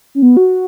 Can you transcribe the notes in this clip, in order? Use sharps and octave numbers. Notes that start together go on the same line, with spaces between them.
C#4
B3
F#4